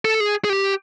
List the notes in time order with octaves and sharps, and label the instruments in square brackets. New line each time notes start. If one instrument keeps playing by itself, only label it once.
[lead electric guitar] A4
G#4
G#4
G4